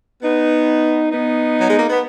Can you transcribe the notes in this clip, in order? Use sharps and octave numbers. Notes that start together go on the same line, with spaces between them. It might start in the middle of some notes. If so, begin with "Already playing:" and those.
B3 D#4
B3 D#4
F#3
G#3
A#3
B3